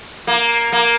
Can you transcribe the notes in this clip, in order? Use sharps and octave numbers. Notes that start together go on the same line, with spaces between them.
A#3
A#3